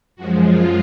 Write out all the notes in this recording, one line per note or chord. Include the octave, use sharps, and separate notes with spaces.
F#2 F3 G#3 F#4
F4